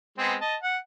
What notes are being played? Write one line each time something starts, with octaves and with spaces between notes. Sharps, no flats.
G#3 B3 C4
D#5 A5
F#5